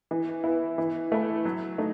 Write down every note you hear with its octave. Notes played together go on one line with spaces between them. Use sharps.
E3
B3 E4
E3
A3 E4
F#3
A3 D#4